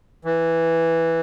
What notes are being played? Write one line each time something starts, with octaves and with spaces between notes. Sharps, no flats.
E3